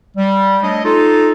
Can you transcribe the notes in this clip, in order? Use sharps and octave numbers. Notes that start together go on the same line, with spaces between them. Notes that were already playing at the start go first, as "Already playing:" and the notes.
G3
A3 D4 C#5 D#5
D#4 F4 A4